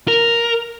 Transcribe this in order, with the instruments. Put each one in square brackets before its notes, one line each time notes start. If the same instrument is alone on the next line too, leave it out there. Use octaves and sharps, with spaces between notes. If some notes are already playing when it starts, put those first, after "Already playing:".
[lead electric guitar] A#4